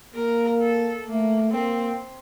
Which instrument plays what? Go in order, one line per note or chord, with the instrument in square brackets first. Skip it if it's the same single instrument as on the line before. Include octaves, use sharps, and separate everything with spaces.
[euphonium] A#3 [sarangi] A#4
[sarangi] A4
[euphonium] A3 [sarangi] A#3
[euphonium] A#3 [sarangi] C4